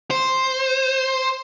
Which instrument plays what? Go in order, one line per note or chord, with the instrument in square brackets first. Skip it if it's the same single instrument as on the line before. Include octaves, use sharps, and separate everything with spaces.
[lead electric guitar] C5